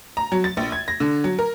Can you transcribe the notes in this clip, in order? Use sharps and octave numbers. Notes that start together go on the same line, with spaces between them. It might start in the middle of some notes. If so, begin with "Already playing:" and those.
A#5
F#3
A6
A#1
G#6
A#6
D3
F#3
A#4